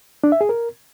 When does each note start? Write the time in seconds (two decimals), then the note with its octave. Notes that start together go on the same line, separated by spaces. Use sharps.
0.24 D4
0.32 E5
0.41 G#4
0.49 A#4